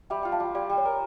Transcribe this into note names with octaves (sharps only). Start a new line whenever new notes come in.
G3 E5 G5
F4 G5
F5 A5
G3
G3 D5 F5
G3
C#5
A#4